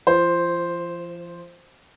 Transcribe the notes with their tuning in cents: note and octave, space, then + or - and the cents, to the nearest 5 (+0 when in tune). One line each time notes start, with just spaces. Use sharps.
F3 -35 C5 +0